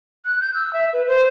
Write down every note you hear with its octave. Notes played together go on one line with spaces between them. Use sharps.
F#6
G6
E6
E5
B4
C5